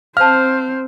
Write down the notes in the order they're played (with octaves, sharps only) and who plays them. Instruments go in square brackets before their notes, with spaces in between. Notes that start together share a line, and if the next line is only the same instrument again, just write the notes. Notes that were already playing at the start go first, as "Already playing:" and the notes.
[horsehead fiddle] C4 C5 [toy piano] F5 A5 [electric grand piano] F6